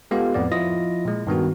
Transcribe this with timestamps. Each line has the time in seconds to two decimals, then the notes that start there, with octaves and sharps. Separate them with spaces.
0.11 G#3 B3 F4 G4 A4 F5
0.34 F2 A2 B3 D5
0.52 F3 E4 F4 D#5 D#6 A#6
1.05 A#2 G#3
1.27 G2 D#3 B3 F#4